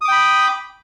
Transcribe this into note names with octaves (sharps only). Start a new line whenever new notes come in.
G5 B5 D6 D#6